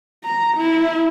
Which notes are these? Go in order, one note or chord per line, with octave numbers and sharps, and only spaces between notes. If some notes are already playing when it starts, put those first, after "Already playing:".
A#5
E4